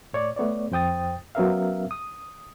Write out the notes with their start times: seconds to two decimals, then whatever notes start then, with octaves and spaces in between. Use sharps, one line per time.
0.13 A2 C#5 D5
0.36 A3 B3 C#5 D5
0.71 F2 C5 G5 D#6 A6
1.35 F#3 B3 C#4 A#4 E5 F5
1.91 D#6